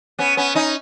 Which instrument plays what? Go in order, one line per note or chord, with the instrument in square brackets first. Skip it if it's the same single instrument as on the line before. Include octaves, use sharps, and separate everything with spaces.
[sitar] B3 C#4
B3 C#4
C#4 D#4